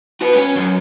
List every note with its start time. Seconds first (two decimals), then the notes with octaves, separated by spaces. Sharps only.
0.21 F#4 B4
0.35 C#4
0.56 F#2